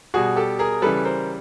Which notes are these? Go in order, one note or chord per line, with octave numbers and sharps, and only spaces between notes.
B2 G3 F#4 G#4
G4 A4
G#4 A#4
C#3 E3 G3 A4 B4
A#4 C5